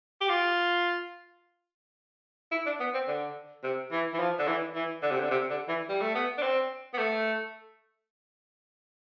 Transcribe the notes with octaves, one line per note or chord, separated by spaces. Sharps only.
G4
F4
E4
D4
B3
C4
D3
C3
E3
E3
F3
D3
E3
E3
D3
C3
D3
C3
D3
E3
G3
A3
B3
D4
C4
B3
A3